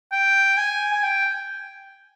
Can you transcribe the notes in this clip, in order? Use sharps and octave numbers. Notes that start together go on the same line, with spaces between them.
G5
G#5
G#5
G5